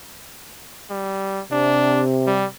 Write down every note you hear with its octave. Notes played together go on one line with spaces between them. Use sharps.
G3
C3 D4
G3